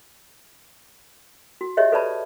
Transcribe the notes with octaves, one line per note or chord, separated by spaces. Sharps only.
F#4
G4 G#4 C#5 D#5 E5
A4 B4 C#5 D5 A5 B5